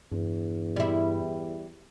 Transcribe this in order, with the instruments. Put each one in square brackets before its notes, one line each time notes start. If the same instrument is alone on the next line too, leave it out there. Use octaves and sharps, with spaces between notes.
[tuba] E2 [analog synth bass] G2
[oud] G3 E4